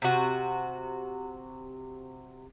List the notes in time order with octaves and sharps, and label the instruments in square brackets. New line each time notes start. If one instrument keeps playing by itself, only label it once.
[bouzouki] C3 F#4